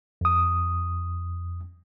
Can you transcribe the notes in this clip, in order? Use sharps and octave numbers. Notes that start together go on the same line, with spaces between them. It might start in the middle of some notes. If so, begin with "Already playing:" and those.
F2 D#6